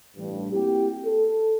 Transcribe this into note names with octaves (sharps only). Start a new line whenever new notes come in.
A1 G2
A#3 C4 E4 F#4 G4
A4